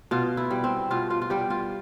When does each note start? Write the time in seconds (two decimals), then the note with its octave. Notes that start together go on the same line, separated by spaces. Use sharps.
0.11 B2 F4
0.37 E4
0.51 G3
0.64 C4
0.91 B2 F4
1.10 F4
1.22 F4
1.30 G3 G4
1.50 F4